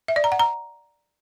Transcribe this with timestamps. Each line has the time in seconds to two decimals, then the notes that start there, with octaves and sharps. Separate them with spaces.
0.08 E5
0.16 D5
0.24 A#5
0.32 F#5
0.39 A#5